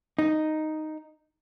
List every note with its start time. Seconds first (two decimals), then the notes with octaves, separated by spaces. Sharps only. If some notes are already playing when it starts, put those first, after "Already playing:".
0.19 D#4